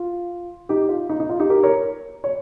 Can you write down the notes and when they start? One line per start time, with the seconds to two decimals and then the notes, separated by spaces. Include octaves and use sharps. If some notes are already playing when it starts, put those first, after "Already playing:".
Already playing: F4
0.69 D#4 G4
0.89 F4
1.09 D#4
1.20 D#4
1.29 F4
1.39 D#4 G4
1.50 G4 A#4
1.63 A#4 C#5
2.24 C#5